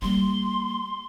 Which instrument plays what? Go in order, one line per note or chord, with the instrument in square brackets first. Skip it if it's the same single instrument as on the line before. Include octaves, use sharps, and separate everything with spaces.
[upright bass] G3 A#3 [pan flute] C6